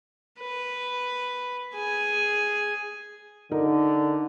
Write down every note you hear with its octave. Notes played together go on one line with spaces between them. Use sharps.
B4
G#4 G#5
D3 D#4 A#4